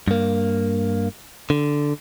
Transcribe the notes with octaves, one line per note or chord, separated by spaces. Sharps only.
G2 A#3
D3